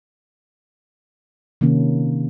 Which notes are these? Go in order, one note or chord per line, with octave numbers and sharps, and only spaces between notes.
C3 D#3 A#3 C#4